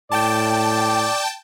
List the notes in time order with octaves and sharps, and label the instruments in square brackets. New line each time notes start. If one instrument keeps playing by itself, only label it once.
[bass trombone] A2 [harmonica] D5 [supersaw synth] G5 A5